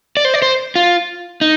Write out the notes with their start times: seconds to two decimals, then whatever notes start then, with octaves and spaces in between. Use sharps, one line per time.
0.17 D5
0.25 C5
0.34 D5
0.42 C5
0.75 F4
1.41 D#4